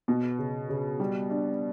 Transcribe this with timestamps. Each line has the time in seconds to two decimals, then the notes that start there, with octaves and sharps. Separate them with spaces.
0.08 B2 B3
0.39 C#3
0.69 C#3
1.00 G3
1.30 D4